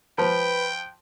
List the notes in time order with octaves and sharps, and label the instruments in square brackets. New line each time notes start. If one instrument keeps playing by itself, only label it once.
[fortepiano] F3 [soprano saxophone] B4 [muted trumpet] G5